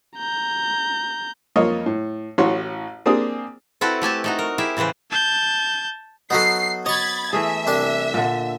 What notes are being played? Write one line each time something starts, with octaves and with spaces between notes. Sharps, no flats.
A#5 G6
F2 A#3 F4 C#5 D#5
A2
A1 A2 F#4 C#5 C6
A#3 C4 D4 G4 G#4 D#6
C4 E4 F#4 A4 B4
A3 G4 G#5 A5
A3 D#4 F#4
A#4
E4 G4 G#4 E5
A2 C#3 E3 B4 C5
A5 G6
F#3 B3 D#4 F#4 A4 C7
C#5 D#5 B5 C#6 G#6 A6
E3 A3 G#4 E5
C2 D4 A5
A#2 D3